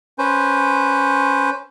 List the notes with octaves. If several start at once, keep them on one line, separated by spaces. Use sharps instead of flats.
C#4 B4 C5